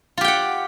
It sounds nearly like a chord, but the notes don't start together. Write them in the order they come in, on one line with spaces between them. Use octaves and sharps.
F4 G4 G5 F#5